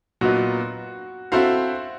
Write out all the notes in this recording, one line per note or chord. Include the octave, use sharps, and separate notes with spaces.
A#2 F#3 B3 D#4 F#4
C4 E4 F#4 A4 C5 F5